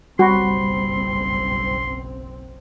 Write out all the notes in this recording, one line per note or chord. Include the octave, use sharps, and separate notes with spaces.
F#1 B1 G3 C4 F#4 B5 C6